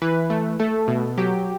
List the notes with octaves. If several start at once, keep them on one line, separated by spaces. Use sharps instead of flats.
E3 B4
A3
A3 A4
B2
F#3 G4